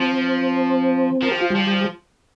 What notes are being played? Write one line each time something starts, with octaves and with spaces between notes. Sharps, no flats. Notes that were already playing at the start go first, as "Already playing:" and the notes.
Already playing: F3 C4
F3 A#4
G4
F4
G3 G4
F3